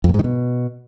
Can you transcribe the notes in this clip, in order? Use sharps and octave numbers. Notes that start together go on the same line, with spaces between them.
F2
A#2
G#2
D#3
B2